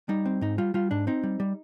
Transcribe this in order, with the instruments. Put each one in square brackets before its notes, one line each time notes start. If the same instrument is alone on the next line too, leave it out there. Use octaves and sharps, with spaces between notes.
[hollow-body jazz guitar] G3 D#4
C4
G#2 D#4
G3 F4
G3 F4
G#2 D4
C4 D#4
G3
G3